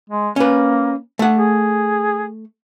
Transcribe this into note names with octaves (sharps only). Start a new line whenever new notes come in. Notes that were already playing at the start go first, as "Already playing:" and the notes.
G#3
A#3 C#4 B4
A3 F#5
G#4